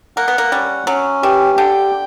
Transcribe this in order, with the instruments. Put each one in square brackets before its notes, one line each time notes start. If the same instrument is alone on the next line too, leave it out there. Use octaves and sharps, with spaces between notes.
[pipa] A#3 [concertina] F#5
[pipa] B3
A#3
[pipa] G3 [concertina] C#4
[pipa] F#3 [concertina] C#4
[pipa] E3 [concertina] G4
[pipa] D3 [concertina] G5